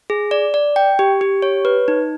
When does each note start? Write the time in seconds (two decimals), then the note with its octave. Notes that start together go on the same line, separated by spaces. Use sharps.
0.10 G#4
0.31 D5
0.54 D5
0.76 G5
0.99 G4
1.21 G4
1.42 C#5
1.65 B4
1.88 D#4